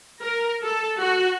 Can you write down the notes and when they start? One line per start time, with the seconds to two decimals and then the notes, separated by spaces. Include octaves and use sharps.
0.23 A#4
0.64 A4
1.01 F#4